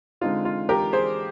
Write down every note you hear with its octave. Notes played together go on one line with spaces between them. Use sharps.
D3 G#3 C4 D#4 F4
F4
G4 A#4
G#4 C5